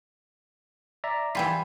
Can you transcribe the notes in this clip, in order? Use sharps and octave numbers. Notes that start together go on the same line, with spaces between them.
D5 E5 A#5
E3 G3 F4 G#5 B5 B6